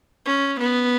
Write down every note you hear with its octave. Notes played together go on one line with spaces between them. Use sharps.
C#4
B3